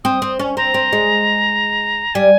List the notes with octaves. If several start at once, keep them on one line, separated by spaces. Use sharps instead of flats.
C4 D#6
C4
C#4
C4 A#5
C4
G#3
G3 G#5